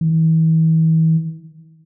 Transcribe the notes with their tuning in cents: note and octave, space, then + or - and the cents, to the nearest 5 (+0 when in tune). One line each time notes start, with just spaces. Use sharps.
E3 -40